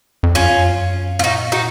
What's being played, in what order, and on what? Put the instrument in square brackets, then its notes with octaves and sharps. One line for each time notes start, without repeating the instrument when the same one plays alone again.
[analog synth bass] F2
[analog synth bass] F#2 [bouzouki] C#4 F4
[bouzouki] F4
[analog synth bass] A#2 [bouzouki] D#4 F#4
[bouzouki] D#4 F#4